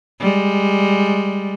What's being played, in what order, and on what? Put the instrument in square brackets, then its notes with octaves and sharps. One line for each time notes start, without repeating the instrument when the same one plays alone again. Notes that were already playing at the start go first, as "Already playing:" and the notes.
[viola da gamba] G3 G#3